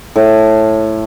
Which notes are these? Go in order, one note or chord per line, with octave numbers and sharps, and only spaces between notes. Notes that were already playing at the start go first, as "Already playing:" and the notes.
A2